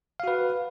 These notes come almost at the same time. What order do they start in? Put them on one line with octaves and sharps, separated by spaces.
F5 F#4 B4